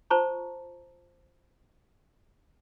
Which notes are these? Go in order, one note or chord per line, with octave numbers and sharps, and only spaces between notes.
F4 C5 A5 A#5 C#6